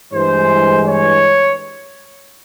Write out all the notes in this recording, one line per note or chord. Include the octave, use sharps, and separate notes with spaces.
G2 E3 G#3 C5
C#5